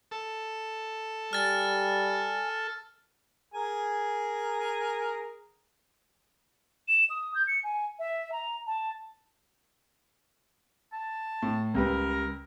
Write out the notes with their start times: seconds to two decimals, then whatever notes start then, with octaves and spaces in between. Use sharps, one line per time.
0.11 A4
1.33 G3 G#5 F6 A6
3.54 G#4 A#4 G#5
6.88 E7
7.10 D#6
7.35 G6
7.48 C#7
7.64 G#5
7.99 E5
8.32 A#5
8.67 A5
10.93 A5
11.42 A2
11.75 C#2 G3 A#4 B4